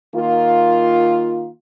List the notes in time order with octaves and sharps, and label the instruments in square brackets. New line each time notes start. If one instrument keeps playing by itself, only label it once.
[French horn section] D#3 A#3 F4